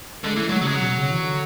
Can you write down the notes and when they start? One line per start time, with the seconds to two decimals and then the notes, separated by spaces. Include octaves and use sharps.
0.24 D3 G#3
0.36 E3 A3
0.49 F#3 G#3
0.61 C#3 F#3
0.68 G#3
0.75 B2 F#3
0.98 C#3
1.10 E3
1.23 D3